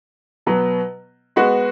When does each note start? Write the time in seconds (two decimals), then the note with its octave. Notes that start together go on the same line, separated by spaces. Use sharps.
0.46 B2 F#3 B3
1.36 G#3 B3 F#4